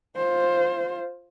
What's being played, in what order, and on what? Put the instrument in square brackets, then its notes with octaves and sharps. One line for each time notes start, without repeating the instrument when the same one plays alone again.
[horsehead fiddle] F4 C5